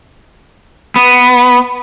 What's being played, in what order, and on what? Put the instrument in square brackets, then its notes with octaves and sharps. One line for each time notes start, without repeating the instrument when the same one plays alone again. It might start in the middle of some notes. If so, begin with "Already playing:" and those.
[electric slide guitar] B3